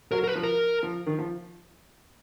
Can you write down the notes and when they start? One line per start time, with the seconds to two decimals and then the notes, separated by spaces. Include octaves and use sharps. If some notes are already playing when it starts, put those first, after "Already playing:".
0.11 F#3 A#4
0.24 A#4
0.27 B4
0.35 F3
0.43 A#4
0.83 F3
1.06 D#3
1.19 F3